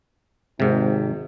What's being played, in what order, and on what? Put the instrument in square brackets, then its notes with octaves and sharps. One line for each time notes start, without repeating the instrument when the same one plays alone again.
[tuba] G#1 [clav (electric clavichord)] G#2 C3